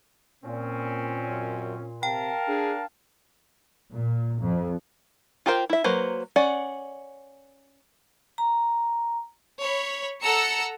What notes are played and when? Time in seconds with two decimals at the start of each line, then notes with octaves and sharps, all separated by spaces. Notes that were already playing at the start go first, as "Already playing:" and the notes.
0.44 A#2 A#3 C4 C#4
1.29 F#2
2.03 C3 A#4 F5 G5 A5
2.48 D4 G#4
3.93 A#2
4.43 F2
5.46 F4 G4 A#4 C5 G5
5.70 E4 E5
5.84 F#3 A#3 B4 C5
6.36 C#4 D5 F#5
8.38 A#5
9.62 C#5 B5
10.23 A4 F#5 A#5 E6 C#7